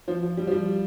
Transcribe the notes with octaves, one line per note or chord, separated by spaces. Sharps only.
F3
F3
G3
F3
G3